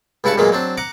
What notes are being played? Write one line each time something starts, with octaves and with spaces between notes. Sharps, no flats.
C#2 G2 E4 F#5 A5 C#6
E2 A#2 F#3 G#3 A#3
F#3 C4 D4
F#5 A#5 D6